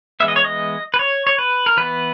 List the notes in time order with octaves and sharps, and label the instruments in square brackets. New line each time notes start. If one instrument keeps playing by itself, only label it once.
[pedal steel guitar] E3 G#3 B3 E5
D#5
C#5
D#5
B4
C#5
C#5
B4
A#4
E3 B3 B4